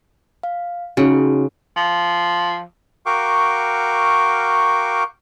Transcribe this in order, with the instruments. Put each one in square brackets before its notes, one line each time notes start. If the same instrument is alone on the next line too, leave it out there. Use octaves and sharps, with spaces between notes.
[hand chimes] F5
[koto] C#3 [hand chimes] C#4 D#4 F#4
[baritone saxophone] F3
[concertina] F#4 A#4 F5 G5 C#6 D6